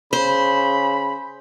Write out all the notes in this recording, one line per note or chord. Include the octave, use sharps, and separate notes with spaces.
C#3 C5 B5